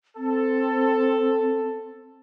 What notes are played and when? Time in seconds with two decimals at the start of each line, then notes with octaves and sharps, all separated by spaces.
0.17 C4 A4